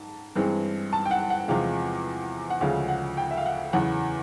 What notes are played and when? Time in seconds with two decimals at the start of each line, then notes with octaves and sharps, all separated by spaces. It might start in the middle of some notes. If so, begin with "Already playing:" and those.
Already playing: G#2 A5
0.36 G2 E3 G#3 C4
0.93 A5
1.05 G5
1.11 F#5
1.30 F#5
1.48 E2 C3 F3 G#3 F5
2.50 F#5
2.61 D2 C#3 F3 G#3 F5
2.88 F#5
3.17 G5
3.31 E5
3.37 F5
3.46 F#5
3.73 E2 C#3 E3 F#5